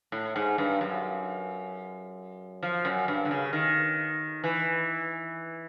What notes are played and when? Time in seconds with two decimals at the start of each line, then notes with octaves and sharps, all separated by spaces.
0.12 A2
0.36 G#2
0.58 G2
0.81 F#2
2.63 F3
2.85 F#2
3.08 G2
3.25 D3
3.31 C#3
3.53 D#3
4.44 E3